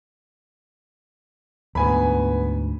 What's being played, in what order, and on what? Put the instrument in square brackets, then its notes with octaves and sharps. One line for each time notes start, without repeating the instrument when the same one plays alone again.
[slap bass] D2 G#2 [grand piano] B3 G#5 B5